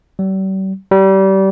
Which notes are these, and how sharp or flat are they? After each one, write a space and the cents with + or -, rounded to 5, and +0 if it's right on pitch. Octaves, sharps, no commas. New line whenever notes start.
G3 -40
G3 -25